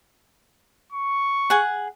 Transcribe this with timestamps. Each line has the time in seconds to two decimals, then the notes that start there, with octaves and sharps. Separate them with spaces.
0.92 C#6
1.50 G#4 F#5